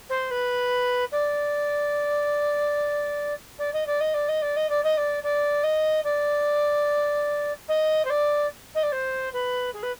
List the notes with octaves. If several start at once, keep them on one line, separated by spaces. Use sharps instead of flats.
C5
B4
D5
D5
D#5
D5
D#5
D5
D#5
D5
D#5
D5
D#5
D5
D5
D#5
D5
D#5
C5
D5
D#5
D5
C5
B4
G#4
B4